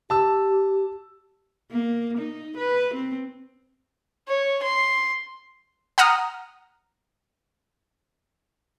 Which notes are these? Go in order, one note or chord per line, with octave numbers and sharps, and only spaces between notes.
G4 A5 E6
A#3
D#4
B4
C4
C#5
C6
F#5 A#5 D#6 F6